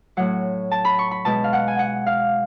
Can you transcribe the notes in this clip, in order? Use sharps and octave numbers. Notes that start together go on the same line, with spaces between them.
A2 F#3 F#5
A5
B5
C#6
B5
B2 G#3 A5
F5
F#5
G#5
F#5
F5